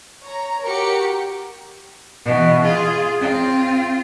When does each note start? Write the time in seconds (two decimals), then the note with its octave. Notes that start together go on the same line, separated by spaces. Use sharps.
0.23 C#5 A#5
0.66 F#4 G4 A#4 C#7
2.24 B2 E3
2.62 F4 G#4
3.20 C4 F4